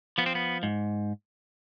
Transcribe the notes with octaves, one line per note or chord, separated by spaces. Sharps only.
F3 B3
C4
B3
G#2